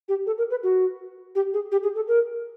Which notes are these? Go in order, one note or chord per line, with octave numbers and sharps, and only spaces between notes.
G4
A4
A#4
B4
F#4
G4
G#4
G4
G#4
A4
A#4